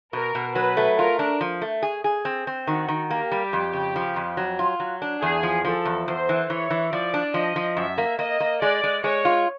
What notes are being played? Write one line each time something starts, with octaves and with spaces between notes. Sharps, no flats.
B2 A#4
B2
F#3 B4
A3
F4 A#4
D4
F3
A3
G#4
G#4
C4
C4
D#3 F#4
D#3
A#3 G4
G3
F2
C#3
F3
F2
F#3
F4
F#3
D4
E2 G#4
F3
F3 A4
E2
E2 C5
E3
E3 C#5
E3
F3 D5
D4
F3 D#5
F3
F#2 E5
A#3
A#3 D#5
A#3
G#3 D5
G#3
G#3 C#5
F4